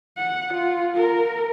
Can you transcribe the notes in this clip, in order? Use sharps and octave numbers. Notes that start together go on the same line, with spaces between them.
F#5
F4
A#4